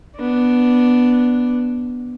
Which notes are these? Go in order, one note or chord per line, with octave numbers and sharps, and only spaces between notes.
B3 D4